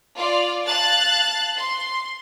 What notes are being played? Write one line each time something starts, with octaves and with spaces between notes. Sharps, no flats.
F4 D5
F5 A5 F#6 A6
C6